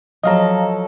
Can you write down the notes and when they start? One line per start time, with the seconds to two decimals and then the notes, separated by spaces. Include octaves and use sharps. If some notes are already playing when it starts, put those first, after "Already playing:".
0.23 F3 F#3 A4 D#5 F5 A#5